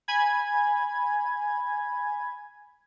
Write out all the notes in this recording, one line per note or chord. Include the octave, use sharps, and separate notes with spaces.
G#5 B5 G#6